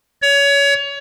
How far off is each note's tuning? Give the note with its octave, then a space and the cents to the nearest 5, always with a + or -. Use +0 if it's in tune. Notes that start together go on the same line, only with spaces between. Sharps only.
C#5 +25